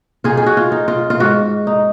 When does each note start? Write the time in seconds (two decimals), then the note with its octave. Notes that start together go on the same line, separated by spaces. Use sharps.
0.24 D#4 F4 G#4
0.37 G#4
0.46 F#4
0.57 F4
0.72 D#4
0.88 F4
1.10 F4
1.20 G#2 F#4
1.67 D#4